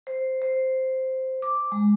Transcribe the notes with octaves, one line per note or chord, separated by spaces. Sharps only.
C5
C5
D6
G#3